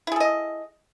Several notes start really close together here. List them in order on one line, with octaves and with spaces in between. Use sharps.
E4 G#4 A4 D#5